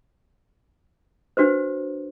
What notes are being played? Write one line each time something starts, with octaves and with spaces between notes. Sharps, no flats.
D4 F#4 B4 C5